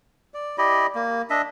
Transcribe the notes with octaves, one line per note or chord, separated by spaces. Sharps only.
D5
E4 G4 D5 D#5
A#3
D4 D#5 E5